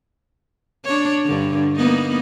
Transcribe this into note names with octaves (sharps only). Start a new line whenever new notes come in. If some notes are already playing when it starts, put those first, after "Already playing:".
D4 C#5
G2 D3
A#3 B3 D#4